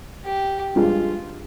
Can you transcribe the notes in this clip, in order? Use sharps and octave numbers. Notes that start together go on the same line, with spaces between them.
G4
G2 F3 G#3 F4